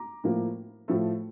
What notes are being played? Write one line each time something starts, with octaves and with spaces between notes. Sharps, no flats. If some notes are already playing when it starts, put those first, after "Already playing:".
Already playing: A#5 D6
A2 F3 A#3
A2 F3 A3